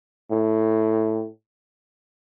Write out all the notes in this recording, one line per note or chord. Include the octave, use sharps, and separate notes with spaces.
A2